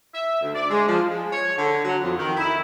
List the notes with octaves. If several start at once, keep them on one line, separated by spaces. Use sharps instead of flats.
E5
D2
D5
G#3
F3
G#3
C#5
D3
F#3
F2
D#3
E4